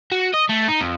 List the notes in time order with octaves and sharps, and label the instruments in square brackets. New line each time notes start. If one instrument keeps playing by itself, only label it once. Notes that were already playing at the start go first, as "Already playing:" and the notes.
[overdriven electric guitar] F#4
D#5
A3
D#4
F2